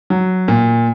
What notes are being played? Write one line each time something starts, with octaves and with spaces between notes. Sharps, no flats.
F#3
A#2